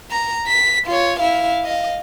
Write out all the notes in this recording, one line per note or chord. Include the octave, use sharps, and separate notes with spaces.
A#5
B6
F4 C#5
E4 F5
D#5 F5